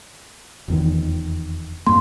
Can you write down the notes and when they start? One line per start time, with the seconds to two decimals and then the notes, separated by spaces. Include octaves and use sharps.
0.68 F1 E2 D#3
1.87 G2 A#3 C6